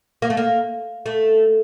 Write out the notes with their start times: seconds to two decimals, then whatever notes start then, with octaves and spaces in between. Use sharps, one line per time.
0.22 A#3
0.30 A3
0.37 A#3
1.06 A3